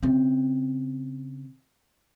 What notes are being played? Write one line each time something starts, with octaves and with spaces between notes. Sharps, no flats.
C#3 C4